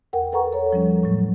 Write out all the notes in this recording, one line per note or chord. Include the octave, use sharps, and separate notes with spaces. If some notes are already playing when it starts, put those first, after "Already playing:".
E2 A#4 F#5 G5
A4 B4 F#5 A#5 C#6
A4 C#5
F3 G3 C#4
A2 F#3 A3